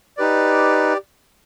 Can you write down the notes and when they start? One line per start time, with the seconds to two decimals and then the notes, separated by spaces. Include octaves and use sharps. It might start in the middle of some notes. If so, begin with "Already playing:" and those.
0.17 D#4 G4 B4 D5